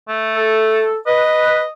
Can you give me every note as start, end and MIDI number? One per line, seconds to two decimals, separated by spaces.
0.09 0.88 57
0.35 0.97 69
1.07 1.61 71
1.07 1.71 75